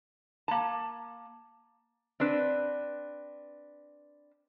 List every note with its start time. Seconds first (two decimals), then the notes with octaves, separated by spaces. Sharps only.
0.48 A#3 A5
2.20 C4 D4 B4